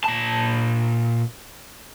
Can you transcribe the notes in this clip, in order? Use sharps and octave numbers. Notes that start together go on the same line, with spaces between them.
A#2 A5